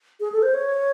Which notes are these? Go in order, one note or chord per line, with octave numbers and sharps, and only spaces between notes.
G#4
A4
C5
C#5